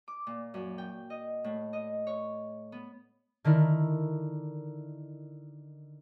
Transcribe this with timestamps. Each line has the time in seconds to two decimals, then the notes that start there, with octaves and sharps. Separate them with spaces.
0.08 D6
0.27 A#2
0.54 F#2
0.78 G5
1.10 D#5
1.44 A2
1.73 D#5
2.07 C#5
2.72 B3
3.44 D3 D#3 E4 A#4